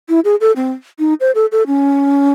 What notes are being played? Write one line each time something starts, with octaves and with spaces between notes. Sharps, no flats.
E4
G#4
A4
C4
D#4
C5
A4
A4
C#4